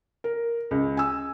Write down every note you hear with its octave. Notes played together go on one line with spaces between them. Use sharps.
A#4
C#2
G#5 E6